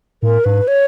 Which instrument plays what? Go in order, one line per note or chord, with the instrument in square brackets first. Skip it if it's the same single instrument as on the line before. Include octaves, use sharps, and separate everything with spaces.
[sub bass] A2 [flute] A#4
[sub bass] G#2 [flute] B4
[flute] C#5